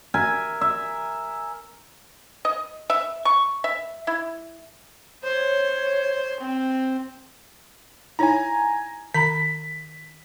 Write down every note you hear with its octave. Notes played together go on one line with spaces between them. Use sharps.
A#4 E5 G#5
E5
D#5
E5
C#6
E5
E4
C5 C#5
C4
D#4 E4 C#5 G#5 A#5
D#3 A#5 B5 B6